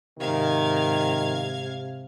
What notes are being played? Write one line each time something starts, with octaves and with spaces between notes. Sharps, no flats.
G#2 C3 D#3 F5 G#6